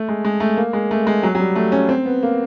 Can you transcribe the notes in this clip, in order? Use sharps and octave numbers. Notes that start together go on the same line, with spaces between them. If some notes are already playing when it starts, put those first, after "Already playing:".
Already playing: A3
G#3
G#3
A3
A#3
G#3
A3
G#3
F#3
F#3
G3
A3
C#4
C4
B3
A#3